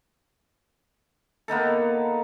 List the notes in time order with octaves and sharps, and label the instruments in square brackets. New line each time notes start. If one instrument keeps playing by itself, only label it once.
[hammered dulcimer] A#3 B3 D#4 A4